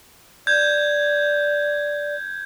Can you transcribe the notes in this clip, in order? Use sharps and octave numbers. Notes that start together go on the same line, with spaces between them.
D5 G6 G#6